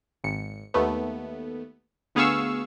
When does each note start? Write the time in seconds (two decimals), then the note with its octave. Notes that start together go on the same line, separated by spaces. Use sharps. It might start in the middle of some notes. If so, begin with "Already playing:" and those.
0.24 G#1 C#7
0.74 D#2 A3 B3
2.15 D2 B3 G#4 F5 C#6 E6